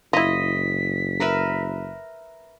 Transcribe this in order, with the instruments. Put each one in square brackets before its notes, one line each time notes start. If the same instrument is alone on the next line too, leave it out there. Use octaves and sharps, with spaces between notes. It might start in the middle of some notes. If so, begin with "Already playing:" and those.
[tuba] F#1 [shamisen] E4 F4 [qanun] D#5 [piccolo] B6
[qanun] A#4 B4 E5